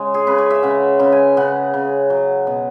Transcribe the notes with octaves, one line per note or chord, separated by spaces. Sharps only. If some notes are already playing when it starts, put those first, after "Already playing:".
Already playing: C#3 G#3 G#5
G#4
C#3 B4
C#5
E5
C#3 F#5
C#3
G#5
C#3 F#5
C#3
F#3
B2